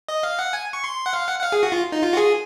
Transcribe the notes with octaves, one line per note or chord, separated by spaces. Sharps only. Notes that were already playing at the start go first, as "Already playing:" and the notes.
D#5
F5
F#5
G#5
C#6
C6
F#5
F5
F#5
F#5
F5
G#4
F#4
F4
D#4
F4
F#4
G#4